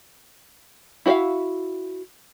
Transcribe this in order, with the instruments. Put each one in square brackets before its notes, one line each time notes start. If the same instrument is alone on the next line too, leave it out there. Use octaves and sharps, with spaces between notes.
[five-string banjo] E4 F#4 A#4 E5 F5